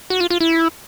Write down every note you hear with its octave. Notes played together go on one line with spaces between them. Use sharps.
F#4
F4
F4
E4